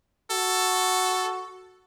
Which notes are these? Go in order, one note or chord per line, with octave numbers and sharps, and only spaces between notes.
F#4 A4